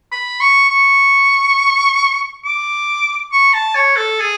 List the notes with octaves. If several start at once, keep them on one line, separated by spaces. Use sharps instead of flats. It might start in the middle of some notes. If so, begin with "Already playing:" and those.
B5
C#6
C#6
D6
C#6
A5
C#5
A4
G#4